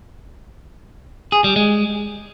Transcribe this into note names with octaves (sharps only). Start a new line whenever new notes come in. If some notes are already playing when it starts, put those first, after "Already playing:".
G#4
G3
G#3